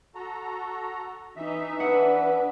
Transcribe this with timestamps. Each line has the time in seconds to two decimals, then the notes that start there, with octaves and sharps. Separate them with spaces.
0.15 F#4 A4 A#5
1.36 E3 D#4 E5
1.80 D4 B4 F#5 D#6